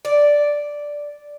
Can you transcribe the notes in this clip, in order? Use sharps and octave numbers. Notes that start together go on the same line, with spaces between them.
D5